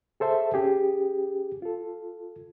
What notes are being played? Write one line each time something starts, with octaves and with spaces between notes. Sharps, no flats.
G#4 A4 C5 E5 A5
C#4 G4 G#4
F4 A4